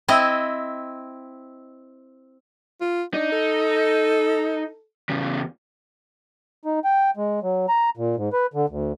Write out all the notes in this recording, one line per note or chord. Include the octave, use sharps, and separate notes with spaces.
C4 E4 D#5
F4
D4 D#4
A4
E2 C#3
D#4
G5
G#3
F#3
A#5
A#2
G#2
B4
D3
D2